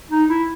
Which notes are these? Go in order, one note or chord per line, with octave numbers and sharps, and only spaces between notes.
D#4
E4